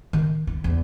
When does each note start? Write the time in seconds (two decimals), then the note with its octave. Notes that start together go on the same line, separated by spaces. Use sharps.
0.13 D#3
0.47 E4
0.64 E2